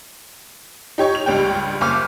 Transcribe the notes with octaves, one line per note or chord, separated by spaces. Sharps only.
D#4 G4 C#5 C#6
F7
C#2 G2 G5
F#1 D6 F6